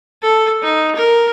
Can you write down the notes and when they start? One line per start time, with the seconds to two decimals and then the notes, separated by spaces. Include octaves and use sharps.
0.22 A4
0.63 D#4
0.96 A#4